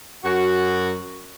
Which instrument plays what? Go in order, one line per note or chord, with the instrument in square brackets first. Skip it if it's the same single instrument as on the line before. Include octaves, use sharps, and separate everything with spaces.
[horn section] F#2 F#4